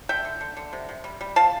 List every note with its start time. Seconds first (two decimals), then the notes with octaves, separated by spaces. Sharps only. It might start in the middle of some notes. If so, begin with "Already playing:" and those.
0.09 D3 E5 G5
0.25 D3
0.41 D3
0.57 D3
0.73 C3
0.89 C3
1.04 G3
1.21 G3
1.36 F3 F5 A5